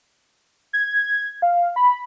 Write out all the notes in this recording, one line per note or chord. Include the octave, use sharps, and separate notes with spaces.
G#6
F5
B5